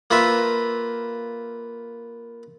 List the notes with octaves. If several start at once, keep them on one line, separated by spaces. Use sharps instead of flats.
A#3 F4 B4 E5